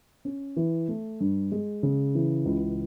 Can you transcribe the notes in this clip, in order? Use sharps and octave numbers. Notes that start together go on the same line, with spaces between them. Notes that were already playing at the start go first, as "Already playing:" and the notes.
C#4
E3
A3
G2
G#3
C#3
E3
C#2